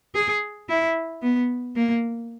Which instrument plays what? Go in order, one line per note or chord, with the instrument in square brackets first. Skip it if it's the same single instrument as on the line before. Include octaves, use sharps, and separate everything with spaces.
[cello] G#4
E4
B3
A#3